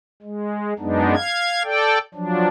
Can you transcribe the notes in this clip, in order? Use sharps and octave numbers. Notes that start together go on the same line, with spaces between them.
G#3
F#2 G#3 B3 D4 D#4
F5 G#6
A4 D5 G5
F3 F#3 D4